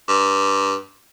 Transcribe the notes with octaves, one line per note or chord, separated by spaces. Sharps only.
G2